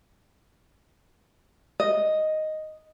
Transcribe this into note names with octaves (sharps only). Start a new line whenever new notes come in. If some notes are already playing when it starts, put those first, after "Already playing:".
D#5